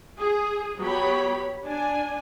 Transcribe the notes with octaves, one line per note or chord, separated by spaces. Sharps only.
G#4
F#3 B3 G4 C#5 B5
D4 G#5